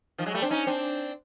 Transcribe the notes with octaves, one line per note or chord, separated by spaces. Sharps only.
D#3 F3
F#3 G#3
G3 A3
C4 D4
C#4 D#4
C4 D4